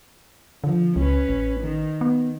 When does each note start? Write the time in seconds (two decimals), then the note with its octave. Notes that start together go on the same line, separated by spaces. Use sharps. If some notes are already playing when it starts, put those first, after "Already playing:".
0.64 D3 F3
0.96 C#2 C#4 B4
1.29 A1
1.60 D#3
2.01 B3